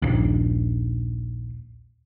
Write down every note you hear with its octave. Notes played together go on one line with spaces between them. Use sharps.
A#1 D#2